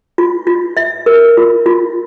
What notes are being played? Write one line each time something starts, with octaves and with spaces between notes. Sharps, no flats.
F4
F4
E5
A#4
F4
F4